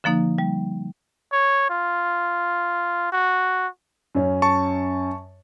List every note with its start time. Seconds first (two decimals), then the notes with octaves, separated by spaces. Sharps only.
0.04 D3 F3 A#3 D#4
0.38 G3
1.32 C#5
1.69 F4
3.12 F#4
4.15 F#2 C#4
4.42 A5 C#6